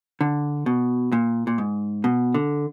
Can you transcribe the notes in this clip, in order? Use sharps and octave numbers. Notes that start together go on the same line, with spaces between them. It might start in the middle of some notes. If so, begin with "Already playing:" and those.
D3
B2
A#2
A#2
G#2
B2
D3